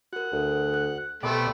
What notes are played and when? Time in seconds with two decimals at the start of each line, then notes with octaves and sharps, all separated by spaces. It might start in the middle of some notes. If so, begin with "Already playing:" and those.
0.13 F#4 A#4 F#5
0.32 D2
0.74 F#6
1.23 C2 B2 A3 D5 G5 B5 C6